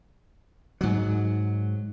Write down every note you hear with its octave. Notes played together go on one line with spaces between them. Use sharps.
G#2 F#3